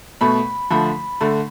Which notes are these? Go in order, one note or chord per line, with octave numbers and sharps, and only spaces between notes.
B2 A3 B5
D3 F3 A3 B5
D3 A3